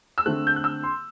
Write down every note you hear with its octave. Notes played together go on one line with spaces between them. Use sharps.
E6
D3 A3 C4 F#6
G6
F#6
E6
C6